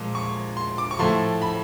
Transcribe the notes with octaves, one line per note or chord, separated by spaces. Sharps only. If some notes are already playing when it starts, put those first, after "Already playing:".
Already playing: A#2 F3 G#3
C#6
C6
D6
C#6
A2 F3 A3 C6
B5